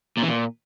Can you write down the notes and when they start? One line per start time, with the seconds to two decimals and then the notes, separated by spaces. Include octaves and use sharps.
0.18 A#2
0.23 E3
0.29 A#2